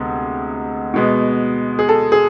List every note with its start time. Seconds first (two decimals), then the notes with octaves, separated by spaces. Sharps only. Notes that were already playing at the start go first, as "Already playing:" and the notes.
Already playing: D2 C3 G#3 B3
0.94 B2 G#3 B3
1.79 G#4
1.89 A4
2.12 G#4